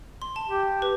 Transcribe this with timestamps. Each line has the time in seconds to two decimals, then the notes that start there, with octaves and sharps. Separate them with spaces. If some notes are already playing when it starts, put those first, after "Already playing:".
0.22 C6
0.36 A5
0.49 G4
0.82 B4